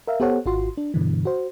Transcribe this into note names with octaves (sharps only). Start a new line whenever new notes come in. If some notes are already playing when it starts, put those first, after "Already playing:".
A#4 E5 F5
B3 G4 A4 C5 C#5 F#5
G#1 F4 F#4 C6
D4
G2 B2 D3 E3
F#4 C5